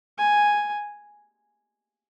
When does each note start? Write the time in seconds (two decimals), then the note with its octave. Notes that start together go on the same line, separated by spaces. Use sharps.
0.18 G#5